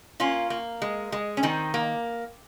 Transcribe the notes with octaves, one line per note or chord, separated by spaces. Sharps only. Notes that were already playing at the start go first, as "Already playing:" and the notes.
A#3 C#4 F4
A#3
G#3
G#3
C#4
D#3 C4 D#4
A#3